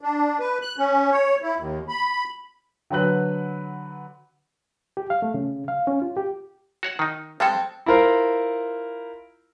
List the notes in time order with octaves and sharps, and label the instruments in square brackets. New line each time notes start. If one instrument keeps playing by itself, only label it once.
[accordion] D4
B4
F#6
C#4
C#5
E4
D#2
B5
[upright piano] D3 F#3 B4 F#6
[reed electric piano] G4
F5
A3
C#3
F5
C#4
F4
G4
[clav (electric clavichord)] F#4 C#5 F#5
D#3 D#4
[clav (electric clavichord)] G3 G#3 A4 [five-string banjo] C4 G5 A5
[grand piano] E4 F4 A#4 C5